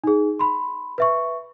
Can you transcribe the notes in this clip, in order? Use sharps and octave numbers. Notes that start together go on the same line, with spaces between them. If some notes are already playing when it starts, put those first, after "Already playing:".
D#4 G#4
B5 C6
B4 E5 C#6